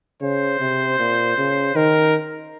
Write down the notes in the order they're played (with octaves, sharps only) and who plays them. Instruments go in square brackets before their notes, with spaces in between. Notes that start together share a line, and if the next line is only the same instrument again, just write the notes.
[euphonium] C#3 [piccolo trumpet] C5
[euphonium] C3
A#2
C#3
[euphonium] D#3 [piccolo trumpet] A#4